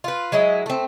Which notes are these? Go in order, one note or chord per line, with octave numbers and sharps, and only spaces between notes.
F4 B4
F#3 G#3 E4 D#5
A3 C4